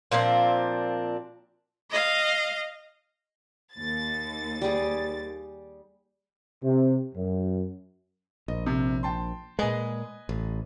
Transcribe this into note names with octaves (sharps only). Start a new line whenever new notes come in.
A#2 F3 C4 D4
D#5 F5
D#2 A6
G3 G#4
C3
F#2
A#1 D#5
C3
G5 A5 C6
A#2 G#3 B4 D#5 G#5
A1